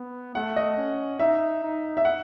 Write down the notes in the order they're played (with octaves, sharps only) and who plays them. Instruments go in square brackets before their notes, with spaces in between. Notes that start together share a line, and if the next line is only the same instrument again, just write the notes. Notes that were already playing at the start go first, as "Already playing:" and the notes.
Already playing: [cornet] B3
[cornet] A3 [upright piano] F#5
[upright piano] D#5
[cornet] C#4
[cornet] D#4 [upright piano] E5
[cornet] D#4
[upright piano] E5
F#5